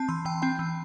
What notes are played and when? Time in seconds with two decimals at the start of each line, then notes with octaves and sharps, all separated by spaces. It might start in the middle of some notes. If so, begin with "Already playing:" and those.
Already playing: C4 A5
0.08 E3 C6
0.25 E3 G5
0.42 C4 G5
0.59 E3